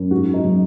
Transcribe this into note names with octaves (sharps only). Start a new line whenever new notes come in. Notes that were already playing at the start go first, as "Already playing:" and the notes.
Already playing: F#2
G#2 F#4
D#4
F#3